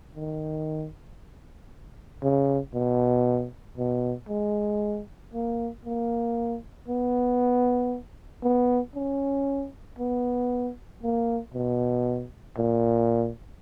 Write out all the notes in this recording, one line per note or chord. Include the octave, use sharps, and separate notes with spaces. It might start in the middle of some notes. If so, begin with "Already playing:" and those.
D#3
C#3
B2
B2
G#3
A#3
A#3
B3
B3
C#4
B3
A#3
B2
A#2